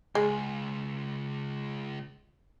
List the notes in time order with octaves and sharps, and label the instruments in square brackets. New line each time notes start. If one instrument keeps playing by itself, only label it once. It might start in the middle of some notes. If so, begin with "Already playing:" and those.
[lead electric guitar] C#2 [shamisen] G#3